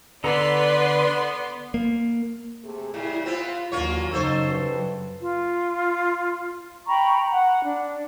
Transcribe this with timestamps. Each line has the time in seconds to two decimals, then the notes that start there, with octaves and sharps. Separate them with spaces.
0.24 D3 B3 A4 B4 D5 A#5 C6
1.74 A#3
2.64 C3 A3 G#4
2.94 A2 C#3 G3 E4
3.26 B3 C4 F4
3.72 D#2 D3 E3 F#3 A#3 F4 C#5
4.12 F#2 C#3 F#3 D#4 A4 C5 C#5
4.49 G2 B4
5.20 F4
6.88 G5 A#5 B5 C#6
7.32 F#5
7.64 D4